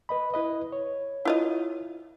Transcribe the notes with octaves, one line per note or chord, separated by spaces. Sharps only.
B4 D#5 B5
E4 B4 D#5
C#5
E4 F4 D#5